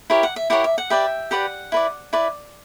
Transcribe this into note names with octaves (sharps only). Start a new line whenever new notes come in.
E4 G4 A#4 C#5
F#5
E5
E4 G4 A#4 C#5 F#5
E5
F#5
G4 B4 D5 E5 G5
G4 B4 D5 F#5
E4 B4 D5
E4 B4 D5